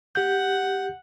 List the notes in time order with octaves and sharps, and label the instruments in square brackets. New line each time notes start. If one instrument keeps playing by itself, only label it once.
[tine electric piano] G4 G6 [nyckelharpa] F#5